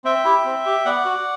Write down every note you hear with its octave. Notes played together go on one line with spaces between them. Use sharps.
C4 E5 G5
E4 G4
C4
G4
B3 D5 F#5
F#4